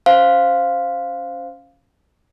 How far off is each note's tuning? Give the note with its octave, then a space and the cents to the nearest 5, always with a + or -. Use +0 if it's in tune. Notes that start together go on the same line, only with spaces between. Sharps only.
C#4 +0 C5 -5 F5 +0